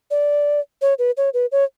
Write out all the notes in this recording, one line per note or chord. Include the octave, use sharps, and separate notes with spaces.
D5
C#5
B4
C#5
B4
C#5